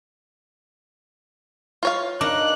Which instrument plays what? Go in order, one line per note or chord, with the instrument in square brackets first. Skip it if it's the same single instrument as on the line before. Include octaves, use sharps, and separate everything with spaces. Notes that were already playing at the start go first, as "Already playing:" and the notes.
[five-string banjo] F4 C#5 F5
[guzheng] D4 D#4 A#4 [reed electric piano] D6 [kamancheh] F#6